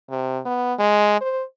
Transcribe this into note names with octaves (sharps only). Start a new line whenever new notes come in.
C3
B3
G#3
C5